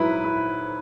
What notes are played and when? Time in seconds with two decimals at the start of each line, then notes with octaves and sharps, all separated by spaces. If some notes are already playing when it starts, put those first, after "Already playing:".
Already playing: G#2 F#3 E4 B4
0.24 E4